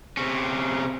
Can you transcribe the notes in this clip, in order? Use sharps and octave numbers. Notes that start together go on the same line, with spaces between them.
C3 C#4